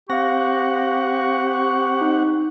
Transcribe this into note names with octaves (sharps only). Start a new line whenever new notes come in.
C4 G4 F5 F#5 C#6 A#6
D#4